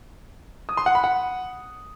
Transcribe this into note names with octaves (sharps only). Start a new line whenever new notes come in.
D#6
C6
F#5
B5
F#5